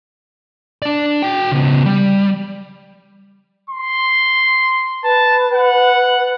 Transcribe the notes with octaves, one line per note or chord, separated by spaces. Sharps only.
D4 D5
F#4 G5
C#3 B3
G3
C6
B4 A5
F#5